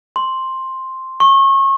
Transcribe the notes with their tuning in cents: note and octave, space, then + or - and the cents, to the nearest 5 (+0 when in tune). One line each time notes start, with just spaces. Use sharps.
C6 +5
C#6 -30